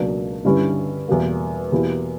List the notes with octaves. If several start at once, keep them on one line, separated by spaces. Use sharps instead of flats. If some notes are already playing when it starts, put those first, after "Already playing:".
Already playing: C#2 B2 F#3 A#3 D4
G2 D3 G3 C#4 E4
E2 B2 G3 A#3
E2 B2 A#3 E4 G4